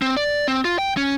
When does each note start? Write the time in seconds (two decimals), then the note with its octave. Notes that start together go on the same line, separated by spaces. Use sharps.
0.02 C4
0.17 D5
0.48 C4
0.65 F4
0.79 G5
0.97 C#4